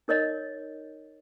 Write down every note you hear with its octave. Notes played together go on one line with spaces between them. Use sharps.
D#4 A#4 C#5 D#5